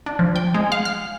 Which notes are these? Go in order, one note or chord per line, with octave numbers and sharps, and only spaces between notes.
D4
F3
G5
G#3
F5
F6